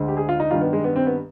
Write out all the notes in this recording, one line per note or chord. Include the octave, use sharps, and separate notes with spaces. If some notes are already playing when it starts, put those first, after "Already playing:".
Already playing: D2 D3 G#3
G4
G#4
F4
D#4
G2 D#3 G3 F4
B3
G#3
B3
C4
B3